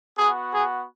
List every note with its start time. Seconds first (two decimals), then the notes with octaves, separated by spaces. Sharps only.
0.18 B3 F#4 G#4
0.52 G#4